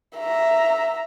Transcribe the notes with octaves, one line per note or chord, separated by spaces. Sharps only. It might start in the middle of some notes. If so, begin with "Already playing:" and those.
E5 A#5